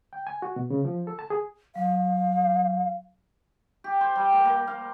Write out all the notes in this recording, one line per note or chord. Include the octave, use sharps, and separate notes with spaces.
G5
G#5
F#4
B2
C#3
F3
A4
A5
G#4
F#3 F5
G4
C5
G3
A#3
A#3
F5